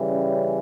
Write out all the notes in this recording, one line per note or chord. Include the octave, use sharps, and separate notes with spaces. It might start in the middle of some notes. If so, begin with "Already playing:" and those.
Already playing: C#3 E3 G3
C#4